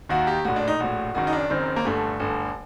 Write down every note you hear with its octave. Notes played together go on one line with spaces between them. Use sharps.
D#2 D#3 F#4
G4
A#1 A2 F#4
D4
D#4
A#1 A2 F#4
F#1 F#2 D#3 F#4
D#4
D4
F#1 F#2 D#3 C4
A#3
G1 G2 D3 A3
G1 G2 D3